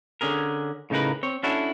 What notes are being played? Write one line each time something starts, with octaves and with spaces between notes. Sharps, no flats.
D3 C#4 G#4 A#4
A2 C#3 D#4 A#4 B4
C4 C#5
C#4 D4 E4 F#4 A4